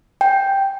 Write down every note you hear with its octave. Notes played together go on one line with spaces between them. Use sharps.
G5